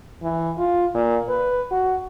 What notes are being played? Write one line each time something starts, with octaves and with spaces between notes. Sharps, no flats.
E3
F4
A#2
B4
F#4